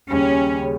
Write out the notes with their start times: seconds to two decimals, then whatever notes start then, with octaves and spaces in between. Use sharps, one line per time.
0.10 D#2 C#3 G3 C#4
0.62 C#3